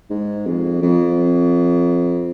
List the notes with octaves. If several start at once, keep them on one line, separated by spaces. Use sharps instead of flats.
G#2
F2
F2